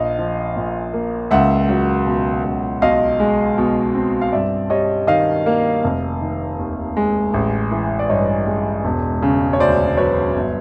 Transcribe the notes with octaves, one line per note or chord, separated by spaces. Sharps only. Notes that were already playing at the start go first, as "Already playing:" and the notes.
Already playing: A#1 D#5 F5
F3
A#2
A#3
C#2 E5 F#5
F#3
B2
C#2
B1 D#5 F5
G#3
B2
C4
F5
G2 D5 E5
G3 C#5 D#5
D#3 D#5 F5
A#3
F1
D#3
D#2
G#3
A1
E3
D5
G2 C#5 D#5
G#3
E1
C#3
C#5
D2 C5 D5
F#3 B4 C#5
G1